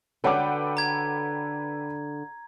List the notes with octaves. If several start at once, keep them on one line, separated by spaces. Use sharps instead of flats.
D3 F#4 A4 B4 C#5 F#5 G5 D6
A#5 G#6